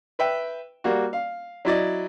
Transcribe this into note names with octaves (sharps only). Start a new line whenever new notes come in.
B4 E5 G5
G3 A#3 F#4
F5
F#3 E4 D5 D#5